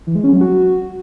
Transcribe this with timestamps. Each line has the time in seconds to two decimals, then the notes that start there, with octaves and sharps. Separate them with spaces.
0.07 E3
0.15 G#3
0.24 C#4
0.32 F#3
0.41 F#4